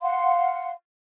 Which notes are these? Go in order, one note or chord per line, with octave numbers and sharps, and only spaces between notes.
F5 F#5 C6